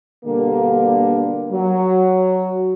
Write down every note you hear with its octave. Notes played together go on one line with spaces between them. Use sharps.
B2 D3 G3 A#3
F#3